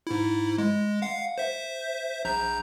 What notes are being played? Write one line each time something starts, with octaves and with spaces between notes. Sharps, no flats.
G#2 E4
G#3
F5 F#5
C5 E5
A#1 A#5 G6